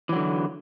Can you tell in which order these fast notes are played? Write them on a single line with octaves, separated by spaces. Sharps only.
E3 F#3 D3